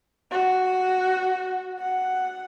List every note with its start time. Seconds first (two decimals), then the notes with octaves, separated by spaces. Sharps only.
0.31 F#4
1.79 F#5